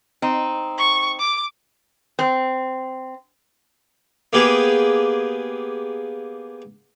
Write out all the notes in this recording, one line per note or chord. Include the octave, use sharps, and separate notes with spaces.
C4 D#4
C#6
D6
C4
A#3 B3 G4 G#4